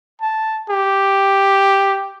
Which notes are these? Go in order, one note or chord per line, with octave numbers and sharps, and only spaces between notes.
A5
G4